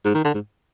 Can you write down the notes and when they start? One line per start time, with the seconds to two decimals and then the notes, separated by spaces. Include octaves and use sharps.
0.05 G#2
0.15 D#3
0.25 D3
0.34 G#2